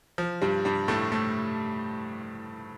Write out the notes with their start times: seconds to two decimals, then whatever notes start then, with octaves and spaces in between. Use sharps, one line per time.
0.18 F3
0.41 G2 G3
0.65 G2 G3
0.88 A2 A3
1.11 A2 A3